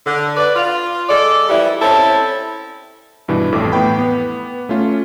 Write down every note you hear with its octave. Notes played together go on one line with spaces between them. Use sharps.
D3
B4 D5
F4
G#3 A4 D5
E3 F3 G3 E4
C4 C#4 E4 A4
G2 B2 E3
A1 F2 A2 A4 D6
A2 B3 G5 B5
B3
A3 C#4 F4